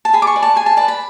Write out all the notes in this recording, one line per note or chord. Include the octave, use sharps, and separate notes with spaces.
A5
G#4 B5
D6
C#6
B4 D5
A5
G#4 G#5
A5
B4 D5 A5
B5